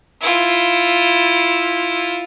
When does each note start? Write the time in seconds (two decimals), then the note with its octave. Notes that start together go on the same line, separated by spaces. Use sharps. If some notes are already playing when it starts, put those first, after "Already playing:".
0.21 E4 F4